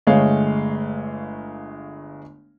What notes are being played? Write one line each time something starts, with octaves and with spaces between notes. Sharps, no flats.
G1 G#3 A3 C#5 F5